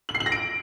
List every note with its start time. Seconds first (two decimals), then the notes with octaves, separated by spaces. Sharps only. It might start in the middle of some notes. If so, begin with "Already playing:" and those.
0.09 F#7
0.15 C7
0.20 F#7
0.26 A#6
0.32 D7